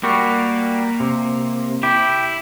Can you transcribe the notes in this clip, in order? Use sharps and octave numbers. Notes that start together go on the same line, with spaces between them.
G3 A#3 F#4
C3
E4 G4